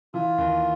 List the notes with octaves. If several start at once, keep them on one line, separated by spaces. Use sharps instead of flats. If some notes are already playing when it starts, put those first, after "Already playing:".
E3 F4
D#2